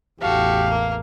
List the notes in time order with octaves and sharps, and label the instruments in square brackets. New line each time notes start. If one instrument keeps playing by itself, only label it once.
[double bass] A1 E2 [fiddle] F#4 A4 [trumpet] G4 [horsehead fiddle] F5
[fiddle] A#3